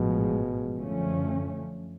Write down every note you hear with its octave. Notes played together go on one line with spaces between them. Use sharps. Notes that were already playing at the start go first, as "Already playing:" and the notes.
Already playing: A1 G#2 B2 F3 G#3
F#2 D3 F3 A3 C#4